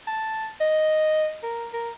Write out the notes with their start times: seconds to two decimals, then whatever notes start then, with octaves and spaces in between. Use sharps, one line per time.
0.07 A5
0.61 D#5
1.43 A#4
1.73 A#4